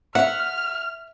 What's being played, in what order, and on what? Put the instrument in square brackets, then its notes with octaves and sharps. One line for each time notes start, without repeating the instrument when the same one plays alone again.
[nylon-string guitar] E5 [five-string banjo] F#5 [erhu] F6